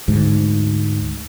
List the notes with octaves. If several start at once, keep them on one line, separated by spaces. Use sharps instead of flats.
D2 G#2